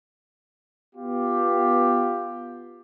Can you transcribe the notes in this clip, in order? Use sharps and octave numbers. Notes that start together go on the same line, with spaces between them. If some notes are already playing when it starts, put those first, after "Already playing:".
B3 F4 G4